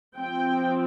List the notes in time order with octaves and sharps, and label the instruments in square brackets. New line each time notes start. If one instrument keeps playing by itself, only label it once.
[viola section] F3 C4 G5